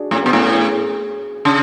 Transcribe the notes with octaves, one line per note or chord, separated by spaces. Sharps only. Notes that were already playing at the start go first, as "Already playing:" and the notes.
Already playing: D4 F#4 G#4
A2 C#4
B2 B3
A2 C#4
G#4
C#3